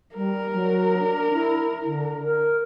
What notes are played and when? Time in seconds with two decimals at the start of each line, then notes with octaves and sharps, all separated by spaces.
0.15 G3 A#4
0.53 F#3
0.98 D4
1.33 E4
1.85 D3
2.23 A#4